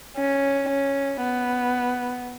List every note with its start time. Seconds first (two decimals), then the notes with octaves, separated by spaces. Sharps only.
0.17 C#4
0.69 C#4
1.22 B3